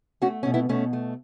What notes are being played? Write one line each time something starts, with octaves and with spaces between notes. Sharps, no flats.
A3 C#4 F#4
B2 C#4
B3 E4
B2 A3 C#4
A3